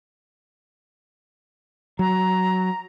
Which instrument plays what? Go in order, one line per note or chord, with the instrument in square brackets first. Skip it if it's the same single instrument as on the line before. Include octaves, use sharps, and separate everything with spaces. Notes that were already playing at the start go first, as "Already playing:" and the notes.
[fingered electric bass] F#3 [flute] A#5